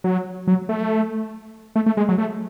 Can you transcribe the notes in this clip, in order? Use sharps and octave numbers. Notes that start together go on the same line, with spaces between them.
F#3
F#3
A3
A3
A3
G#3
F#3
A3